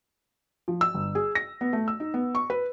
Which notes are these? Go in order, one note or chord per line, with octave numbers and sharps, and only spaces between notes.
F3
E6
G1
G#4
A#6
B3
A3
E6
D#4
B3
C#6
B4